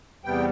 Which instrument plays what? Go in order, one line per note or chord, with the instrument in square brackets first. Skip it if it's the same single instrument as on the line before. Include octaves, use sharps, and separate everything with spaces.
[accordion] E2 C3 G3 B3 G5